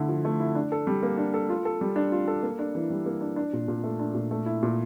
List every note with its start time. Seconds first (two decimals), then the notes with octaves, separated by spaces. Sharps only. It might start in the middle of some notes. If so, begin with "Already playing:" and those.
Already playing: D3 A3 E4
0.08 F3
0.25 A3
0.40 E4
0.55 D4
0.72 A4
0.87 G3
1.03 A#3
1.18 D4
1.34 A4
1.50 F4
1.65 A4
1.81 G3
1.96 D4
2.12 F4
2.27 A4
2.43 A#3
2.59 D4
2.75 E3
2.90 G3
3.06 A#3
3.21 D4
3.36 D4
3.53 A#2
3.68 A#2
3.84 A3
3.99 D4
4.14 A#2
4.31 A3
4.46 E4
4.63 A#2